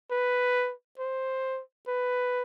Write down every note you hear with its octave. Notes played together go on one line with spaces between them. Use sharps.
B4
C5
B4